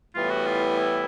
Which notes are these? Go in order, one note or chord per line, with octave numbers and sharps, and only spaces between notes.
A2 E3 G3 B3 F4
F#4
F4
E4